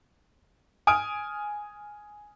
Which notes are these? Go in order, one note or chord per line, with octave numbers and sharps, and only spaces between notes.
G#5 D#6 F6 D7